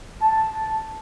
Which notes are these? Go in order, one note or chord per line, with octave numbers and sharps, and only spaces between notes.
A5